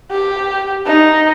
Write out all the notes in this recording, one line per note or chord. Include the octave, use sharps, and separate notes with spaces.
G4
D#4